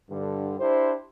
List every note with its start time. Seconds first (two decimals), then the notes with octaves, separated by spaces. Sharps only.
0.11 G2 D3
0.60 D4 E4 G4 C5